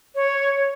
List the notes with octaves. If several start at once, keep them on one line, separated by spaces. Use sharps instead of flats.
C#5